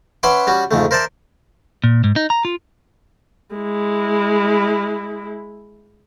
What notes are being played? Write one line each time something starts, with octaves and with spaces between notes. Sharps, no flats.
C#4 B4 E5 F#5 C6 D6
G3 C#4 F#4
F2 G#2 C#3 A3
A#4 C5 D5 E5 A5
A#2
G#2
D#4
A#5
F4
G#3 E4